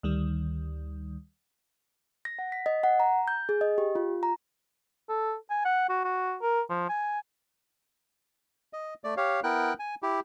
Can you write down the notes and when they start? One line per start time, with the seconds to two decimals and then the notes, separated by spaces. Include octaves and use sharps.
0.03 D2 D#3 G3
2.25 A#6
2.39 F#5
2.52 B6
2.66 D#5
2.83 F#5
3.00 A#5
3.28 G6
3.49 G#4
3.61 D#5
3.78 G4
3.95 F4
4.23 A#5
5.09 A4
5.50 G#5
5.65 F#5
5.90 F#4
6.04 F#4
6.42 A#4
6.70 F3
6.89 G#5
8.73 D#5
9.04 A3 D5
9.17 G4 C#5 F5
9.44 B3 E4 A#4 G5 F#6
9.79 G#5
10.03 E4 G4